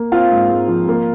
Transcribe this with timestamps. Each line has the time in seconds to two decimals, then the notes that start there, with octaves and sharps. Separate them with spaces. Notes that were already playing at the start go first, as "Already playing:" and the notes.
Already playing: A#3
0.12 C4 F4 F5
0.30 G#2
0.49 G#3
0.68 F3
0.88 A#3